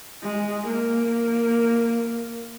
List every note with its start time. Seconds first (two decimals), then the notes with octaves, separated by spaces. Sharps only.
0.23 G#3
0.67 A#3